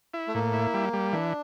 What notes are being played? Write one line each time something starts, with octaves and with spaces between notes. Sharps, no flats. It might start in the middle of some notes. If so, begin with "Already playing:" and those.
E4
A3
A2 A#3
E4
G3
G3
E3 D4